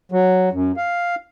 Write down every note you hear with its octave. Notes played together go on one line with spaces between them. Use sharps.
F#3
F#2
F5